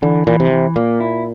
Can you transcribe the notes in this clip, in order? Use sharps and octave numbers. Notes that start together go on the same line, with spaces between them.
D3 E3
A#2 E3
C3
E3
A#2 A#3
E4